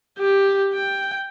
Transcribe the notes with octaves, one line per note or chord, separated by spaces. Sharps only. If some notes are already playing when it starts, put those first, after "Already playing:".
G4
G5